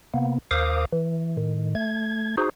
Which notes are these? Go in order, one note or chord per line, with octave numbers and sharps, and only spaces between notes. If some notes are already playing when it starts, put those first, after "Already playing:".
C3 A#3 B3
D#2 A#4 C5 F5 D6 D#6
E3
A2 D#3
A3 G#6
D#4 F#4 G#4 C5